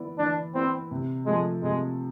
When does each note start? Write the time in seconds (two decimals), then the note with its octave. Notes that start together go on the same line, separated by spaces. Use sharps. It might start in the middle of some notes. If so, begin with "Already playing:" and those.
Already playing: E3 B3 E4 B4 D5
0.18 E3 D4
0.54 B3 C4 E4 B4 D5
0.91 C3
1.26 F3 G#3 A3
1.63 C3 G#3